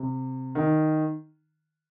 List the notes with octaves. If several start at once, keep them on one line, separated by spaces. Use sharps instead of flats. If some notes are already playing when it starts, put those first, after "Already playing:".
Already playing: C3
D#3